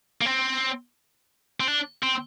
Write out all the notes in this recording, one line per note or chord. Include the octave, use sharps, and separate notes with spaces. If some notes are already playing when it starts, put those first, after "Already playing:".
A#3
C4
C4
D4
C4